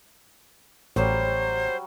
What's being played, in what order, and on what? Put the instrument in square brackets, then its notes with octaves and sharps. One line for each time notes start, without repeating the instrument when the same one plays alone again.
[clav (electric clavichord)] A1 [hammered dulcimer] F#3 G3 [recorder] C5